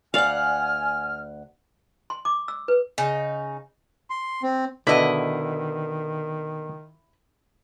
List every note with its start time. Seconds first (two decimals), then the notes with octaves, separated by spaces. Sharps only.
0.14 D2 D5 F5 F#5 G#5 F6
2.10 C6
2.25 D6
2.48 E6
2.68 B4
2.98 C#3 D#4
4.10 C6
4.43 C4
4.87 B2 D3 D#3 E4 D#5